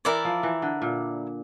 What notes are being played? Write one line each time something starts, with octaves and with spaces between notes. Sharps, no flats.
E3 E4 A#4 D5
F3
E3
D3
A#2